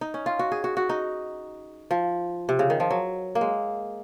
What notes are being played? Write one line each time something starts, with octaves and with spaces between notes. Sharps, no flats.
D#4
C#4
F4
F#4
G#4
F#4
F#4
D#4
F3
C3
C#3
D#3
F3
F#3
A#3
G#3